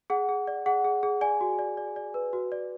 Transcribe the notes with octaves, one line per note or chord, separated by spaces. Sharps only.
G#4 F#5
G#4
D5
G#4 F#5
G#4
G#4
D5 G#5
F#4
D5
D5
D5
B4
F#4
D5